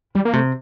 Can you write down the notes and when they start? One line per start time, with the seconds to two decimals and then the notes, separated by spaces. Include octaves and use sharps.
0.15 E3 G3
0.25 A#3
0.33 C3 A3